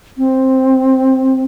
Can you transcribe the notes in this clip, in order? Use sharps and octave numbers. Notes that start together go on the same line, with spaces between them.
C4